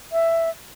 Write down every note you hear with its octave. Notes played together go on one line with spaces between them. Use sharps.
E5